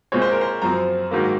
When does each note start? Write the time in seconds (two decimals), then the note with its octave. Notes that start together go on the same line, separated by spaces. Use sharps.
0.12 A#2 G#3 C4 C#5
0.22 C5
0.32 A#4
0.41 C5
0.62 F#2 F3 C4 A#5
1.11 G#2 D#3 F#3 A#3